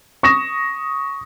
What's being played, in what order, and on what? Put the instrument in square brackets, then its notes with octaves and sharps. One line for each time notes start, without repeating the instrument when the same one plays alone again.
[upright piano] C#6 D#6 A#6 E7